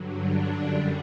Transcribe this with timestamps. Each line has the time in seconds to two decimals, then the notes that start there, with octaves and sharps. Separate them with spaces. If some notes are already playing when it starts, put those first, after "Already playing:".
Already playing: G2 D3 F#3
0.20 D4
0.52 F#2 D3 G3